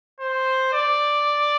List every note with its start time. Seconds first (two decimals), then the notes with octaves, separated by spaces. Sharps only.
0.20 C5
0.73 D5